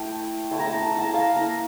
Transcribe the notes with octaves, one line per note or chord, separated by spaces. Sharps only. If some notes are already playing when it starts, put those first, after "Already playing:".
Already playing: A3 E4 G5
A3 E4 A5
A#5
A5
A#5
A5
A#5
A5
A#5
F5 A5
A#3 E4 A#5